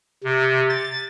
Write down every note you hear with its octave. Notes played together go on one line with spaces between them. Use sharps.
C3
A6